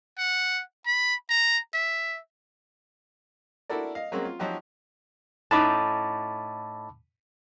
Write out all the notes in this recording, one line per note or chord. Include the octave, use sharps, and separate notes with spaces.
F#5
B5
A#5
E5
D4 E4 F#4 A4 A#4 D5
D#5 F5
F#3 G#3 A#3 C4 C#4
F4
F3 F#3 D#4 F#4 G4
A2 C#4 D#4 A5 B5 D6